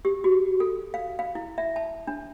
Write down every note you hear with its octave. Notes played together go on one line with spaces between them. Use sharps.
G4
F#4
A4
F5
F5
E4
E5
A5
D4